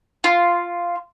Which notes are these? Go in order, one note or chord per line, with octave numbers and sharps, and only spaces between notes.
F4